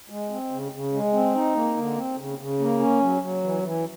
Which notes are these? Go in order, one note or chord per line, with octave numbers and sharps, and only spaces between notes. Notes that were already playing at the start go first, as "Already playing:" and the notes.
G#3
C4
C#3
C#3
G#3
C4
D#4
A#3
D3
C4
C#3
C#3
A#3
C#4
F#3
F#3
E3
E3